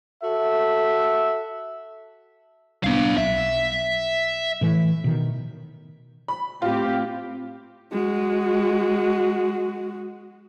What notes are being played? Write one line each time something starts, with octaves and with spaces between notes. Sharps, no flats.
F#4 A4 E5
C2 B3 D4 F5
B1 E5
A2 E3
B2 D#3
B5
A2 C4 F4 G4
G#3 F#4